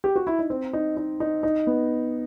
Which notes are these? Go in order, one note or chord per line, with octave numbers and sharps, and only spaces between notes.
G4
F#4
E4
D#4
C4
D#4
D#4
D#4
D#4
B3